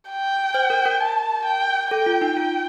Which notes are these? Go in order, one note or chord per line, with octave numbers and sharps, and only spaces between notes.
G5
C5
A#4
A#4
A5
G5
A4 G5
F4
D#4
F4 G5